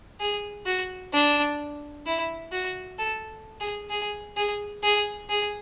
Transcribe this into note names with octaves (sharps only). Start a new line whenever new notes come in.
G#4
F#4
D4
E4
F#4
A4
G#4
G#4
G#4
G#4
G#4